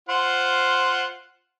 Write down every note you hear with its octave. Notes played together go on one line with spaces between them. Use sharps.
F4 C5 F#5